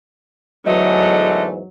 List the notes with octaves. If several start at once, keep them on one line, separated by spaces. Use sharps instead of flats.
E2 G#2 D3 E3 F#3 A3 D#5